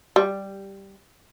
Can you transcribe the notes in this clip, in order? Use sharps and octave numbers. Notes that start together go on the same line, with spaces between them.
G3